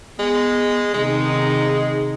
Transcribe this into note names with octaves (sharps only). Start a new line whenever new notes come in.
G#3 B3
C3 D#3 G#3 D#4